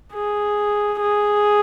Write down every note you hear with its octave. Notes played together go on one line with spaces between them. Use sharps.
G#4
G#4